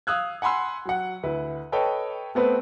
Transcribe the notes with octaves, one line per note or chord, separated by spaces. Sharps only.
F5 D#6 E6 F#6 G#6
F#5 G#5 B5 C6 E6
F#3 F#5
D2 E4 B4
A4 B4 C#5 D#5 G5
A3 B3 C4 B4